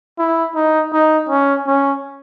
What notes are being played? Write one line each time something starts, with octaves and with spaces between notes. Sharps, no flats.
E4
D#4
D#4
C#4
C#4